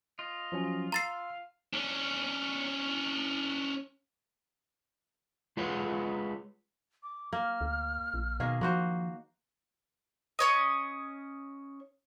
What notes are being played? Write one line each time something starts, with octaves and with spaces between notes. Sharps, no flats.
F4 D#5
F3 F#3 C#4
F5 A#5 C6 E6 A6 C7
C#4 D4
G#3 F4 G#4 B4 C#5 F#5
D6
A#3 F6
D2
A#1
B2 D#3 A#3 G#4
F3 A#3 F#4 C5
C#4 C#5 D#5